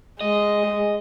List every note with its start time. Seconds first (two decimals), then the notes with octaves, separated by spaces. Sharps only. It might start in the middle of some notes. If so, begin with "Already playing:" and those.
0.21 G#3 D#5